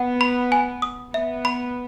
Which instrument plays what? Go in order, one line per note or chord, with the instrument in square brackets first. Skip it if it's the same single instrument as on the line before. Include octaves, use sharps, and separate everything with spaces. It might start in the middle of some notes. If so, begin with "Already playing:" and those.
Already playing: [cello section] B3 [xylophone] F#5
[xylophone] B5
G#5
D#6
[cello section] B3 [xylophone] E5
[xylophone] B5